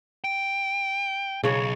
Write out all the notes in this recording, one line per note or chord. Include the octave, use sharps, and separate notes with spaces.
G5
B1 C#3 C#5